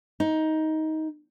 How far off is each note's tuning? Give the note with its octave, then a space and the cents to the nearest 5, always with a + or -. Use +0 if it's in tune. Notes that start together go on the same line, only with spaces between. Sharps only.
D#4 +15